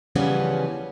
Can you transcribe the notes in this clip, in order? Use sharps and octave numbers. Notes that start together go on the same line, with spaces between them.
C#3 E3 F3 G3 B3 C#4